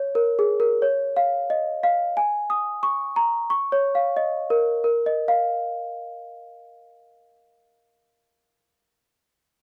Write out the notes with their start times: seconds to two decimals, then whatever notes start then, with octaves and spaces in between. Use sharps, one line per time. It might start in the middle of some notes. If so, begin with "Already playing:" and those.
Already playing: C#5
0.15 A#4
0.39 G#4
0.60 A#4
0.82 C#5
1.17 F5
1.50 D#5
1.83 F5
2.17 G#5
2.50 D#6
2.83 C#6
3.16 A#5
3.50 C#6
3.72 C#5
3.95 F5
4.17 D#5
4.50 A#4
4.84 A#4
5.06 D#5
5.28 F5